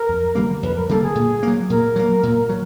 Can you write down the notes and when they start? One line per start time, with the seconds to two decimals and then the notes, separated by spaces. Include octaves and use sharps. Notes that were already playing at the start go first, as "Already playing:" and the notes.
Already playing: A#4
0.09 F2
0.35 D3 G3 A#3
0.62 F2 B4
0.76 A#4
0.89 D3 G3 A#3 A4
1.02 G#4
1.15 A#2
1.43 F#3 A#3
1.70 A#2 A#4
1.96 F#3 A#3
2.23 A#2
2.49 F#3